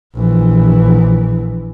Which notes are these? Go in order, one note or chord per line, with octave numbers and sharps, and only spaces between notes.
A#1 E3